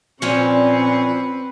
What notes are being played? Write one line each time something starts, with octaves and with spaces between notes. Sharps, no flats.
A#2 F3 C4 C#4 B4 D5 C#6